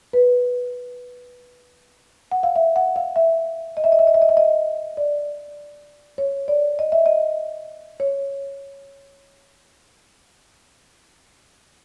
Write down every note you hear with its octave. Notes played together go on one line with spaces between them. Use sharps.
B4
F#5
F5
E5
F#5
F5
E5
D#5
E5
D#5
E5
D#5
E5
D#5
E5
D#5
D5
C#5
D5
D#5
E5
D#5
C#5